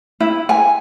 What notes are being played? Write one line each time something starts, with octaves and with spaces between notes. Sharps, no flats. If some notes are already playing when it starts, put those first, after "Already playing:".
E4
G#5